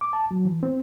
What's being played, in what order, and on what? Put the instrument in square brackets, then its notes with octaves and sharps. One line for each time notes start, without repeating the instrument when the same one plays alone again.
[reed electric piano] D6
A5
F#3
E3
C4